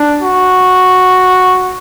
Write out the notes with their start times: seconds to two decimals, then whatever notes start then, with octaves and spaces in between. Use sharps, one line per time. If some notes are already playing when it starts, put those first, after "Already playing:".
Already playing: D4
0.22 F#4